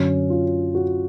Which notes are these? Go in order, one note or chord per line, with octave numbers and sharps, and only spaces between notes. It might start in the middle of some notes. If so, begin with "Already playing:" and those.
Already playing: F#2 D3 F#3 C#4
F4
F#4